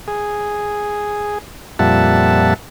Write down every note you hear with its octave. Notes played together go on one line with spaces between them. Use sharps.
G#4
F2 A#2 G3 E5 F#5 A5